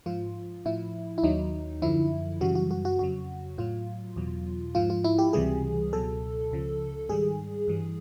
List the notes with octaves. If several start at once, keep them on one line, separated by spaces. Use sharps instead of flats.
G#2 F3 F4
A2 F3 E4
E4
D#2 D#3 F#3 D#4
F#2 D3 F3 E4
F#2 C#3 E3 G3 F#4
F#4
F#4
F#4
F2 C#3 F#3 F#4
A2 F#3 F4
E2 B2 F#3
G#2 F3 F4
F4
E4
G4
C#2 C3 E3 G3 G#4
C#2 B2 F#3 A4
C#2 C#3 F3
G#2 D#3 G3 G#4
G2 E3 G3